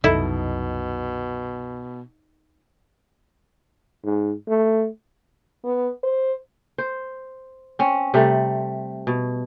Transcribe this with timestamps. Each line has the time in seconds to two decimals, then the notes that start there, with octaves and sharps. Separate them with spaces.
0.04 C2 F#2 B2 D#4 E4 A4 D#5
4.04 G#2
4.48 A3
5.64 B3
6.03 C5
6.78 C5
7.79 C4 C#4
8.14 C3 G3 A3
9.07 B2